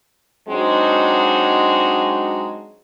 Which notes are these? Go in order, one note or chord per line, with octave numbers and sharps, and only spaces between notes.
F#3 G#3 C4 D4 D#4 F#4